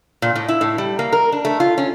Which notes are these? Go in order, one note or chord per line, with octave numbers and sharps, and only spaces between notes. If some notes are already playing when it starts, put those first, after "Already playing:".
A#2
A2
E4
A2
G3
A#3
A#4
D4
A3
F4
C#4